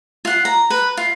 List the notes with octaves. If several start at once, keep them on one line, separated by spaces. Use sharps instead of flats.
F4 F#5
A#5
B4
F4